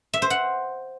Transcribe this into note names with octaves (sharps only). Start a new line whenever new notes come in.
E5
C5
F#5